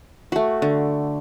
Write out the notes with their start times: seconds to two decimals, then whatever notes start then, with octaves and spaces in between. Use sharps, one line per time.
0.32 A3 F#4
0.62 D3